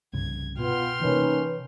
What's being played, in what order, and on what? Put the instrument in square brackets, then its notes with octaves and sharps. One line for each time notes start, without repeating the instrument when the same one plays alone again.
[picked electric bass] C2 G2 C#3 [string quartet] G#6
[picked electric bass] B2 [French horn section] B3 F4 [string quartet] G5 C6 F6
[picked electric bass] C3 E3 [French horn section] A#3 C#4 D#4 [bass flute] B4